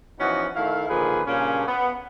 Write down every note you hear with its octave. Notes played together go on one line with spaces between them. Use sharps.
E3 F3 B3 C#4 D#4 F#4
D#3 A3 E4 F5
A#2 D3 D#3 F3 G#4 B4
G2 A#2 C#3 A#3 C#4
B3